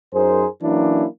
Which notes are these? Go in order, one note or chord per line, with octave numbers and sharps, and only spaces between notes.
F#2 D#4 G#4 A#4 C5
E3 F#3 A#3 C#4 D4 E4